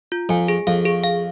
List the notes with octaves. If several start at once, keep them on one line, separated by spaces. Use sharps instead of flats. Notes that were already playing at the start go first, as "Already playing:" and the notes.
F4
F2 G#5
G#4
F2 F5
G#4
F5